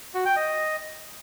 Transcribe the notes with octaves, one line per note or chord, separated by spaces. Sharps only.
F#4
G5
D#5